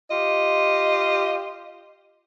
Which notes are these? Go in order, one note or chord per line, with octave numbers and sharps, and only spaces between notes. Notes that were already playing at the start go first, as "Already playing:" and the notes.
F4 G4 D#5